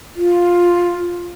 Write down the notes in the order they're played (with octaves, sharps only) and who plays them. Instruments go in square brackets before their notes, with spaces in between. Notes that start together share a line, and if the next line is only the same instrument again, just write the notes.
[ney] F4